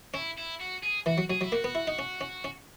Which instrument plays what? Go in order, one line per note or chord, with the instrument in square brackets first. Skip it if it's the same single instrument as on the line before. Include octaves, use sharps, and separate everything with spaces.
[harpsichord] C#4 [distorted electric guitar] E4
[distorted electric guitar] E4
F#4
G#4
[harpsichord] E3 [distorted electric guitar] F#4
[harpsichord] F#3
[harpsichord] F#3 [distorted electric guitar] G#4
[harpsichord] F#3 [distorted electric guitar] E4
[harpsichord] A#3 [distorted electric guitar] F#4
[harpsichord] B3
E4
D#4
C#4
C#4
C#4